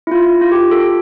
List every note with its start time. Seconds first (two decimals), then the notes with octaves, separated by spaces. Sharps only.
0.07 E4
0.11 F4
0.27 F4
0.41 F4
0.52 G4
0.71 A4